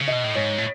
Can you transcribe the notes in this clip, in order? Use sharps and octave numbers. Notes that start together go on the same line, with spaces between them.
C#3
B2 D#5
A2
G#2 C#5
A2